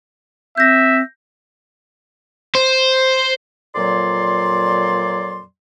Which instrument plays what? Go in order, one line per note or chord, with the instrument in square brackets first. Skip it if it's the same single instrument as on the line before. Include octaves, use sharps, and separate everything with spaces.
[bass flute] C4 [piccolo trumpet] E5 [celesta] G6 A#6
[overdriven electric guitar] C5
[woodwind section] F2 A#2 F#3 D5 C6